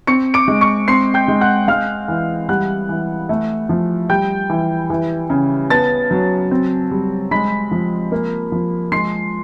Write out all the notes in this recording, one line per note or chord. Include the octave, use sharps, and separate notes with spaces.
C4 C#6 C#7
D6 D7
G#3
C#6 C#7
C4 C6 C7
G5 G6
G#3
F#5 F#6
G#3 F5 F6
E3
G3 F#5 F#6
E3
A3
F3
G3 G5 G6
E3
E3
C#3
B3 A5 A6
F#3
C4
G3
G#3 B5 B6
F3
A#3
F3
G#3 C6 C7